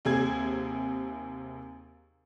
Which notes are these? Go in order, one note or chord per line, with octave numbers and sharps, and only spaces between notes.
D#2 C3 G#4 G#6